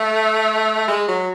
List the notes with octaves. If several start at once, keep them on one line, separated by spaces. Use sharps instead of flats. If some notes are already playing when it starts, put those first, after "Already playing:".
Already playing: A3
G#3
F#3